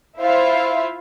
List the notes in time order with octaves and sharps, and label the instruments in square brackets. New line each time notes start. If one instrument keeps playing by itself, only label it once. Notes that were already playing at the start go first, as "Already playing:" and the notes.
[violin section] E4 F4 C5 E5 F5